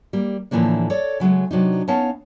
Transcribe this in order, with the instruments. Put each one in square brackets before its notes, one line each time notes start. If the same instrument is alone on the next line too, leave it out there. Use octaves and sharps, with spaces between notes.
[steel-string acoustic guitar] G3 A#3
A2 D3 E3 F3 A#3 D4
A4 C#5 D5
C#3 F#3 G#3 A3
C3 F#3 D4 D#4
B3 C#4 D#4 C#5 F5 A5